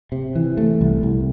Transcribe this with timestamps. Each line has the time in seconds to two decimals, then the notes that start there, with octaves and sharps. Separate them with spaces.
0.12 C3
0.35 E3
0.57 A3
0.81 C2
1.03 C2